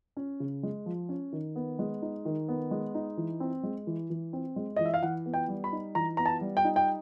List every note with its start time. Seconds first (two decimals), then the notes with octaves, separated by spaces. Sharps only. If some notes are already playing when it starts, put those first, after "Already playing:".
0.17 C#4
0.40 C#3
0.63 G#3
0.86 F3
1.09 C#4
1.33 D#3
1.56 B3
1.79 G#3
2.02 D#4
2.25 D#3
2.48 B3
2.71 G#3
2.95 D#4
3.17 E3
3.40 C4
3.63 G#3
3.87 E3
4.10 E3
4.33 C4
4.56 G#3
4.76 E3 D#5
4.86 E5
4.94 F5
5.02 E3 F#5
5.26 B3
5.34 G5
5.48 G3
5.64 B5
5.72 D#4
5.95 E3 A#5
6.17 B3 A#5
6.26 A5
6.41 G3
6.57 G5
6.64 D#4
6.76 G5